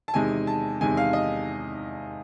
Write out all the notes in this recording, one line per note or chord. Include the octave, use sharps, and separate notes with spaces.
A5
E2 C3 D#3 G#3 G#5
A5
E2 C3 D#3 G#3 G#5
F5
D#5